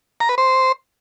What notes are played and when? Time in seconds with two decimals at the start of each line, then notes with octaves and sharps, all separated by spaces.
0.20 A#5
0.29 B4
0.38 C5